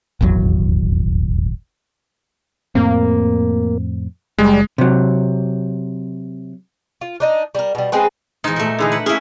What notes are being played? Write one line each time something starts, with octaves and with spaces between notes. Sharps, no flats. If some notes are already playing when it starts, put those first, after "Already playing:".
D#1 G#1 E2 F#3
F2 A2 A#3 C4
F#1 G3 G#3
C3 F#3
F4
D4 D#4 D#5
G3 A#4
B2 G3
G#3 C4 G#4 B4
E2 G#2 D#4
A#2 A3
D3 E3 D#4 G#4
B4 F#5
A#3 C#4 E4 G#4